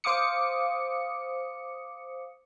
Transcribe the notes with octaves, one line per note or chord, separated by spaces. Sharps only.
C5 F5 D6 D#6 C#7